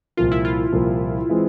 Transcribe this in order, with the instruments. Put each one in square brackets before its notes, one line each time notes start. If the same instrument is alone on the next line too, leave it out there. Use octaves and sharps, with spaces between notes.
[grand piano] C2 A#2 F3 A#3 [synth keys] F4
[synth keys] E4
F4
[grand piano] C2 A#2 F3 A#3
E3 G#3 C4